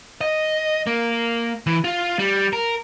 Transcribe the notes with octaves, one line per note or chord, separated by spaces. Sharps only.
D#5
A#3
E3
F4
G3
A#4